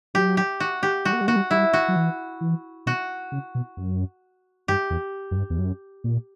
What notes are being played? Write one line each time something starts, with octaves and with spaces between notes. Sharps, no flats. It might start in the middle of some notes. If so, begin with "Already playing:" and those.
F#3 G4
G4
F#4
G4
G3 F#4
A#3
G3
A#3 F#4
G3
G3 E4
F#4
F#3
E3
E3
B2 F#4
C#3
B2
F#2
G2 G4
E2
F#2
G2
E2
F#2
A#2